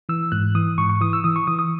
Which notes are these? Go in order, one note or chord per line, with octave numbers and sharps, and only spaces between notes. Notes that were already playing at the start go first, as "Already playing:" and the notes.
E3 E6
G#2 F#6
E3 D#6
G#2 C#6
C#6
E3 D#6
E6
E3 D#6
C#6
E3 D#6
D#6